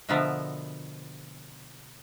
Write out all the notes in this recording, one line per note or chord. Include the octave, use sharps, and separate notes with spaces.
B2 D3 F3 B3 A#4 E5